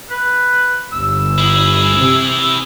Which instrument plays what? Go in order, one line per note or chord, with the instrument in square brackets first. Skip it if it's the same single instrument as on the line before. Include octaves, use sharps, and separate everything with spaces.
[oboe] B4
[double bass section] G1 [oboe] E6
[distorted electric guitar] E4 G#4
[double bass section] C3